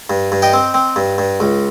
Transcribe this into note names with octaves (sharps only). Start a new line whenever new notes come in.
G2
G2
D#5 G5
C4
C4
G2
G2
C#2